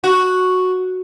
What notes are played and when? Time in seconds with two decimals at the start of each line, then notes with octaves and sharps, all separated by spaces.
0.04 F#4